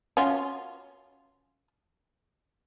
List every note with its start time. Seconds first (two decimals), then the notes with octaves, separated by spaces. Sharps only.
0.17 C#4 F4 F#4